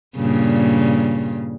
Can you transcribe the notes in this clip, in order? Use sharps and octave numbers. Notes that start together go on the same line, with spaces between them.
G2 A#2 C#3